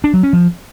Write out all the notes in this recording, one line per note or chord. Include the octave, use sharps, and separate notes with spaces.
D4
F#3
C#4
F3